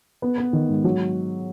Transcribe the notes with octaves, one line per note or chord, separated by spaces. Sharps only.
B3
B3
D#3
G#2
F#3